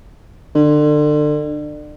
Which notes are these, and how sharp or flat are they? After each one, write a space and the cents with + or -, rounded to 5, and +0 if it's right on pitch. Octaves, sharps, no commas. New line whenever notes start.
D3 +30